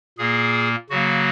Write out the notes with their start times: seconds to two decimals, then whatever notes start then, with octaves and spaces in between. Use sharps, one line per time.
0.18 A#2 A#3 G#4
0.90 C#3 F#3 A#3 F#4